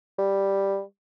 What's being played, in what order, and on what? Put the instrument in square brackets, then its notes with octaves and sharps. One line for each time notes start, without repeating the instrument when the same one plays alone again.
[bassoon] G3